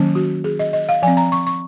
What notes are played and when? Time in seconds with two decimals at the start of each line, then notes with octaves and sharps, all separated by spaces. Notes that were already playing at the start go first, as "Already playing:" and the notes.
Already playing: D#3 F#3 A#3 C#4
0.15 F#4
0.44 G#4
0.59 D#5
0.73 D#5
0.89 F5
1.02 F3 C4 G#5
1.17 A#5
1.32 C#6
1.47 C#6